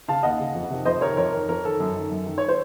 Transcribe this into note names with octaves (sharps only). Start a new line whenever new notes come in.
C#3 F5 A5
D#2 D#5 F#5
C#3
F2
C3 D#3
F2 C5 D#5
C3 D#3 A#4 C#5
F2 A#4 C#5
D#3
F2 A#4
D#3 A4
F#2
D#3
F#2
D#3
C#5
C5